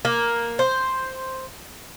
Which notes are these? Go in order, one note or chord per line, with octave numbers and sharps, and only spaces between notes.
A#3
C5